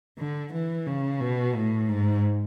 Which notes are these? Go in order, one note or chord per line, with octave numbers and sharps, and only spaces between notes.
D3
E3
C#3
B2
A2
G#2